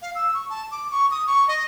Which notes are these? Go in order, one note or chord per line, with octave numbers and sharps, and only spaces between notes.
F5
E6
C#6
A5
D6
C#6
D#6
C#6
D#5